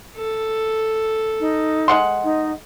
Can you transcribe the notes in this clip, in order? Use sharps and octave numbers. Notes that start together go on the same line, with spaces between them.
A4
D#4
G#3 F#5 C6
D#4